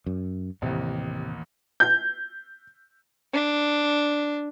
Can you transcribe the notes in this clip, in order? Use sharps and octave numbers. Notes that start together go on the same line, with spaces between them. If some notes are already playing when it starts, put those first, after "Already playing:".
F#2
A1 D#2 A2 C3
G6
D4